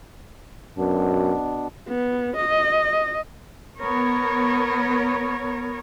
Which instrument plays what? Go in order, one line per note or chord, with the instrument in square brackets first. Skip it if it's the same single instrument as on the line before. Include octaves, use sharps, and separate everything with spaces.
[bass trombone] F#2 [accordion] B2 B3 D4
[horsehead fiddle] B3
D#5
[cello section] B3 A#4 C#5